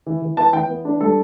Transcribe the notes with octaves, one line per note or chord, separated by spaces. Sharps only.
E3
E3
B3 A5
E3 G5
B3
D4
G3 A4